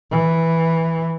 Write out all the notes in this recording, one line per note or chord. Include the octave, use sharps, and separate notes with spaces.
E3